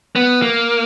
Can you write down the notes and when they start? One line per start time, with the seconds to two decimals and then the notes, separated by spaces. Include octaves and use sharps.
0.16 B3
0.42 A#3